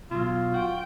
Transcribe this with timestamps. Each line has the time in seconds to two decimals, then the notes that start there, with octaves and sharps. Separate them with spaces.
0.11 B2 F#3 F4
0.54 F#4 G5